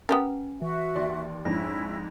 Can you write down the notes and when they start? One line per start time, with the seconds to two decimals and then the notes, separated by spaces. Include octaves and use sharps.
0.09 B3 C#4 G4 A#4
0.62 E3 F#4 E5
0.95 D#2 D5 C6
1.45 F2 G#2 C#4 D4 E4 A#6